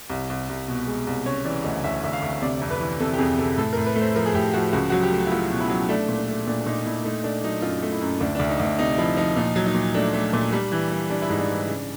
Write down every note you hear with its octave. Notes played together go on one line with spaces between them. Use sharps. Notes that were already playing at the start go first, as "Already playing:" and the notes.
C2
C2
C2
B2
G#3
C2
C#3 C#5
E3 D5
D2 D#5
D2 E5
D2 E5
F5
D2
C3 D5
F2
B4
E3
C3 A4
G4
F2 G#4
C3 A4
A2 A4
A2 A#4
B4
A3
C5
F3 A#4
G#4
A2 G4
F3 F#4
C#2 F#4
F#3 F#4
G4
A3
E4
A3 F4
B2
E4
F#3
A3 D4
A#2
D4
A3
A#2 D4
D4
A#2 D#4
A#2 E4
A3 D#4
A3 D4
F#3 D#4
F#2 F4
A3
E4
F#2
D2 D4
D2 D4
D#4
D2
D4
C3 D#4
F3 E4
F3 D#4
A#2 D#4
F#3
D#4
A#2
A3 D4
A3
A#2
G3
E3
G3
G3 D4
E4
G#2 D#4
D4
E3
C#3